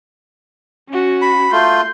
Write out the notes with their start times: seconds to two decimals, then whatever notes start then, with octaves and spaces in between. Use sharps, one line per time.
0.89 C#4 F#4
1.22 B5
1.52 A3 F4 C6 G6